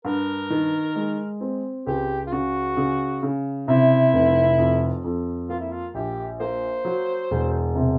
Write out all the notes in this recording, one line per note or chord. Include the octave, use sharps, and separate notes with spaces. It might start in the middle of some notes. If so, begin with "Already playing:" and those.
G2 A#4
D#3
G#3
C4
C#2 G4
F4
C#3 F#4
C#3
C#3
C3 E4
F1
F2
F2
A#3 F4
E4
F4
A#1 G4
A#3 C5
F#3
E1
C3